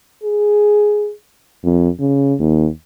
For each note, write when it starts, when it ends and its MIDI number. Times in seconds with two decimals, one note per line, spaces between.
0.23 1.12 68
1.64 1.89 41
2.00 2.34 49
2.39 2.68 39